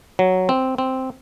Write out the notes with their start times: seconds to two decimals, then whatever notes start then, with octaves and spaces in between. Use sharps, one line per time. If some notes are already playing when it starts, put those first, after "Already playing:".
0.19 F#3
0.49 C4
0.78 C4